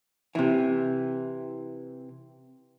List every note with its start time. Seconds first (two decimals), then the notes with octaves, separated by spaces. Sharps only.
0.35 C3 E3